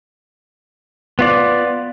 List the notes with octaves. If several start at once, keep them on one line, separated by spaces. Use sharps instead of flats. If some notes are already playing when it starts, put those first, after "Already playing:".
B3 F4 D5